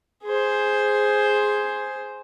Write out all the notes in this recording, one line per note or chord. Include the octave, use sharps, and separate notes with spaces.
G#4 C5